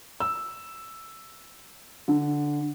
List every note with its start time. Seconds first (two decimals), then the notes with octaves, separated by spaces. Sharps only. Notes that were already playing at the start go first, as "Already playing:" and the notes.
0.20 E6
2.08 D3